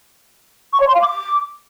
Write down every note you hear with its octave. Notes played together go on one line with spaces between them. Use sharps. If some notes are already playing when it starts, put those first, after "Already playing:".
C#6
C#5
C6
F5
D6